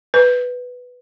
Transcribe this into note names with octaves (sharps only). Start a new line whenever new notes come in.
B4